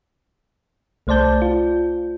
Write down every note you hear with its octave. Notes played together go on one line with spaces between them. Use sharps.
C2 A3 C5 D5 A5 G6
F4